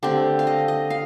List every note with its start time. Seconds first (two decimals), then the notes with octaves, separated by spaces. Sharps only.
0.03 D3 A3 C4 G4
0.39 F5
0.47 D#5
0.68 D#5
0.90 F5